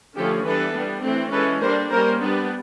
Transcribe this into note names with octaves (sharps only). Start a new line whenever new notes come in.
D3 F3 A3 C#4 G4 A4
E3 G3 B3 D4 A4 B4
G3 B3 D4
E3 A3 C4
E3 G#3 C#4 A4 B4
G3 A#3 D4 A#4 C5
G3 A#3 C#4 A#4 C5
G3 B3 D4